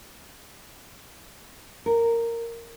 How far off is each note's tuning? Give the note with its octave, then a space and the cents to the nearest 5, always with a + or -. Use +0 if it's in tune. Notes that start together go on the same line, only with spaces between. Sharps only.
A#4 -10